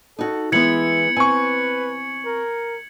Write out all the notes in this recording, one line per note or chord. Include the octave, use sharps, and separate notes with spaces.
D#4 F#4 A4
E3 G#3 B3 E4 G#6 C#7 F#7
C4 B4 G#5 C#6
A#4